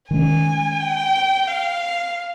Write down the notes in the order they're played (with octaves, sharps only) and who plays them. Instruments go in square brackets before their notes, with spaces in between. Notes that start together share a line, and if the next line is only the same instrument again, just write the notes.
[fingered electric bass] D#3 G#3 C#4 [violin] G#5
[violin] G5
F5